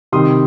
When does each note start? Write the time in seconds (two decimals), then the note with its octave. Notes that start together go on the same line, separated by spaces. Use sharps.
0.12 C3 D#3 G3 C6 D#6